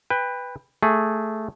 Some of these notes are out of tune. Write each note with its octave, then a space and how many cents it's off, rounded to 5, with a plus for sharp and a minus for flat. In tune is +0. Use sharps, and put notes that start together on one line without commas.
B4 +0 G5 +30
A3 +0 G#4 +0